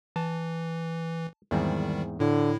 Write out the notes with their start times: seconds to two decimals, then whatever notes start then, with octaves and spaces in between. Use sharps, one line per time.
0.16 E3 A5
1.51 E2 G#2 D#3 G3 C4
2.20 A2 D3 E4